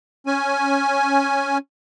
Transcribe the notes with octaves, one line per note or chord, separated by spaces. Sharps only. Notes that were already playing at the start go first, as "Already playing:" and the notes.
C#4 G#5